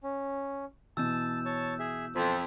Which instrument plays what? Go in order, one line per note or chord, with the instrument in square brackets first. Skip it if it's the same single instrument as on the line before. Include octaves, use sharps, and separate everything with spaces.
[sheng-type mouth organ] C#4
[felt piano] B2 E3 [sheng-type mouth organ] A5 [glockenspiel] E6 G6 E7
[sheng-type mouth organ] C#5 A5
G#4 E5
[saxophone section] F2 [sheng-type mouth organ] A4 C5 [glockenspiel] C6 B6